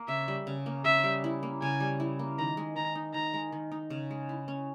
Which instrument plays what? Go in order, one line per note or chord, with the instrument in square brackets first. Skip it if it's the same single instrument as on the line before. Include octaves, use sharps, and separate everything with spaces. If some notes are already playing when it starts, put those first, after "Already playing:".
Already playing: [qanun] A#3
[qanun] C#3 [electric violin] E5
[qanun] G3
C#3
A#3
[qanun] C#3 [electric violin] E5
[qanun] G3
E4
A#3
[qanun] C#3 [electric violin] G#5
[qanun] G3
E4
A#3
[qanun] D#3 [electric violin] A#5
[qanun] G#3
[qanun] D#3 [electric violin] A#5
[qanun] D#4
[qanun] D#3 [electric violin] A#5
[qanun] G#3
D#3
D#4
C#3
G#3
E4
C#4